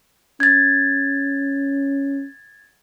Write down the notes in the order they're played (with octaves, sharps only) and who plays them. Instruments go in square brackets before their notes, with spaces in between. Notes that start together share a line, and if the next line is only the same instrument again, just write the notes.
[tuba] C#4 [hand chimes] G#6 A6